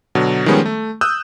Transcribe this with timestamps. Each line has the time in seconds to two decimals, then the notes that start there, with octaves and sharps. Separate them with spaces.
0.15 B2 D3 F#3
0.46 D#3 F3 G3 G#3 B3 C#4
0.66 A3
1.01 D#6 E6 F#6 G6